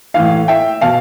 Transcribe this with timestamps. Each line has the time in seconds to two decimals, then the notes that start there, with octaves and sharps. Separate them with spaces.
0.14 A2 E3 F5
0.48 E5 G5
0.81 B2 F5 A5